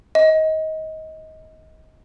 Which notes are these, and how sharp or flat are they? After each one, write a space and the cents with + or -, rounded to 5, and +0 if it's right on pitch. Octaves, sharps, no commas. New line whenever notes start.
D#5 +20